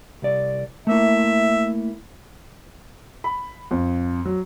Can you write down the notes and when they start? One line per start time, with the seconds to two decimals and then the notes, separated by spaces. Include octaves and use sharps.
0.22 C2 D5
0.87 A3 A#3 E4 E5
3.24 B5
3.71 F2
4.25 F#3